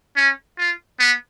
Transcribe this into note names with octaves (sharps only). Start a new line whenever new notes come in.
C#4
F4
B3